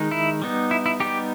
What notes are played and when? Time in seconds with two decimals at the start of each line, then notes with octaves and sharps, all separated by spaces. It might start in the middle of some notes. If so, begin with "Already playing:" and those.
Already playing: D#3 G#3 D#4
0.11 E4
0.42 G3 B3 D#4
0.71 E4
0.86 E4
1.00 G3 B3 D#4 G4